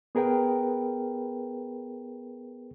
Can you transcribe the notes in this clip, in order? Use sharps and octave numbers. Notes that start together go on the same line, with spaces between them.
B3 G#4 A#4 B4 G5